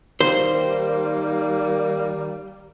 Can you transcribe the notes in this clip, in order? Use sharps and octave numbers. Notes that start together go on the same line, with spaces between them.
D#3 G3 A#3 C5